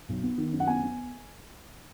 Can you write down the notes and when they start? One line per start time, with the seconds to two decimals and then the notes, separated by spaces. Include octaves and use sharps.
0.09 B1
0.23 B3
0.38 D#3
0.53 F#2
0.60 F#5
0.67 B3 G#5
0.83 B3